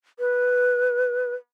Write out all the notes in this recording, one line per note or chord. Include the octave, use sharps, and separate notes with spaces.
B4